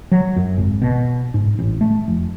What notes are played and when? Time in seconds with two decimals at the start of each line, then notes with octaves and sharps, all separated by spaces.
0.12 F#3
0.36 F#2
0.58 G#1
0.82 B2
1.34 G#2
1.59 A1
1.81 A3
2.08 F1